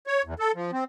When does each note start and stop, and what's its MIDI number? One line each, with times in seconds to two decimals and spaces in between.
0.07 0.22 73
0.25 0.34 40
0.39 0.52 69
0.55 0.71 53
0.73 0.84 60